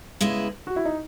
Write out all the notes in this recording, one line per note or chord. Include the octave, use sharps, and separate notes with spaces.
C#3 G#3 B3 E4
F#4
E4
D#4